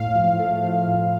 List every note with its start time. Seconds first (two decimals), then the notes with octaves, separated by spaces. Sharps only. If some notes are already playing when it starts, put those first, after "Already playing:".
Already playing: A2 F5
0.16 F3
0.39 A3
0.64 F3
0.88 A2